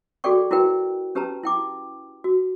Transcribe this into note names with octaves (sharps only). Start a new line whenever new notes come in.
F#4 G#4 A4 D5 G5 C#6
E4 F#4 A#4 B4 G5
C#4 G4 B4 A5 A#5
E4 G5 D6
F#4